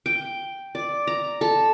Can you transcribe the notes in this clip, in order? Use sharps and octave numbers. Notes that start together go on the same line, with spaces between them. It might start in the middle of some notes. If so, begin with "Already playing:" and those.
G5
D5
A#5
A4